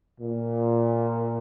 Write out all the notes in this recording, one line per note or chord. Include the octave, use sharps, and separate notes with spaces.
A#2